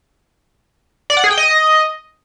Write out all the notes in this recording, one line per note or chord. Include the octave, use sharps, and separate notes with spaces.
D5
F#5
G#4
G5
D#5